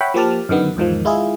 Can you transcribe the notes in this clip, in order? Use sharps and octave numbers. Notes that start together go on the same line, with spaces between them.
C#5 E5 F#5 G5 B5
F3 A#3 G4 A5 F6
F#2 D3 D#3 B3
E2 G#2 D#3 F3
G#3 E4 F4 G#4